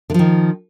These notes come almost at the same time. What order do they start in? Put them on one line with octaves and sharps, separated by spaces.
D3 F3 D#3